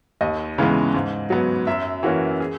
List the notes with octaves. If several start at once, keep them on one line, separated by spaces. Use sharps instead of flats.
D#2 D#5
C#3 E3 G#3 B3
G#2
F#3 B3
F#2 E5
E3 A#3 C#4 F#4
G#4